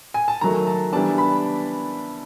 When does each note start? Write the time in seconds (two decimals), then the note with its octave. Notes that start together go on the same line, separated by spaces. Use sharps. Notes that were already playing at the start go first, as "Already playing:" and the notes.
0.14 G#5
0.28 A5
0.41 D#3 F#3 A3 A#5
0.67 A5
0.92 E3 G3 B3 D4 A5
1.18 B5